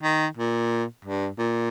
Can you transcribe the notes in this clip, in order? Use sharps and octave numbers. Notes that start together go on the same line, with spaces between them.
D#3
A#2
G2
A#2